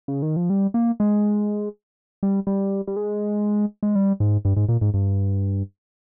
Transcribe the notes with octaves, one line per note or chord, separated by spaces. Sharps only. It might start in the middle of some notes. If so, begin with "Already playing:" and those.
C#3
D#3
F3
G3
A#3
G#3
G3
G3
G3
G#3
G#3
G3
G#2
G2
G#2
A#2
G#2
G2